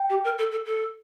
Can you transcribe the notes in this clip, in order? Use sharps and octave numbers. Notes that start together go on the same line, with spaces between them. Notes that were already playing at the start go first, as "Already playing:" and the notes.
Already playing: G5
G4
A#4
A4
A4
A4